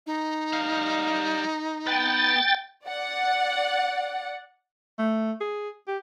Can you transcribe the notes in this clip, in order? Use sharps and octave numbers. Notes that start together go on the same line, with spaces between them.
D#4
G3 F5
B3 B4 G5 A6
D5 F#5
A3
G#4
G4